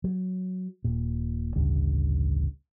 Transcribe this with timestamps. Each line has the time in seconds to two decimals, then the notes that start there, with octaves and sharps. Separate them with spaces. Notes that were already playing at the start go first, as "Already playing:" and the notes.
0.04 F#3
0.84 D#1 A#2
1.56 A1 D2 G2 C#3